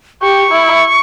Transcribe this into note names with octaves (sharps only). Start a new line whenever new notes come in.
G4 C#6
E4